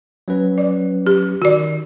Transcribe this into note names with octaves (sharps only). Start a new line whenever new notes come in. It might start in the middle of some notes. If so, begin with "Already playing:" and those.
F#3 C#4 B4
D5
G4
D#3 F#4 D5